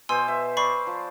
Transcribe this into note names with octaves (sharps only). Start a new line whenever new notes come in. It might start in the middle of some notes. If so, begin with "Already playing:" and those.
B2 C5 G#5 C6 E6
E5
B4 C5 D5 B5 C#6 C7
F3